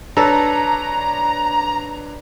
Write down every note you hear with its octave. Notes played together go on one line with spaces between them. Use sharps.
D4 A4 B4 C#5 A#5